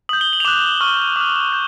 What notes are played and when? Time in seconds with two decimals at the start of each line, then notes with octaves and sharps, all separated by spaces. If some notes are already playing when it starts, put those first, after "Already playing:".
0.09 D#6 G6 F#7
0.21 G7
0.33 F#7
0.40 F7
0.45 D6 F#6 E7
0.81 C#6 F6
1.16 D6 F6
1.53 G6